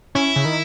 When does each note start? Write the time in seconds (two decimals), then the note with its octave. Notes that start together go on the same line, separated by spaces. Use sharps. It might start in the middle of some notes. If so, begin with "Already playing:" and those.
0.15 C#4 E4
0.36 C#3
0.45 D#3